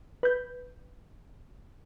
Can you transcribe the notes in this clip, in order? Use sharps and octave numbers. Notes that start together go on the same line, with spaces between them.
B4 G6